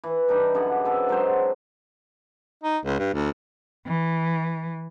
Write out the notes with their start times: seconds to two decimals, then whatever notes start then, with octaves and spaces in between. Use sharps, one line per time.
0.04 E3
0.29 G3 D4 D#4
0.54 F#2 D3 G#4 F#5
0.85 C4 A4 B4
1.09 F#3 G#3 C5
2.63 D#4
2.85 C#2
2.99 G2
3.13 D2
3.87 E3